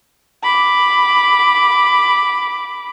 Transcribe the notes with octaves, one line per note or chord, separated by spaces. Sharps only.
B5 D6